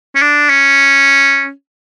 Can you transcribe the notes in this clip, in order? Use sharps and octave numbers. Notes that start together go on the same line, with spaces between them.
C#4
D4
C#4